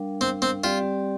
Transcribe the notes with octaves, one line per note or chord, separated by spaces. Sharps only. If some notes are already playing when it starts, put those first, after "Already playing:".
Already playing: G3 D4 A#4 F5
C4
C4
G3 C4 F4 G4 D5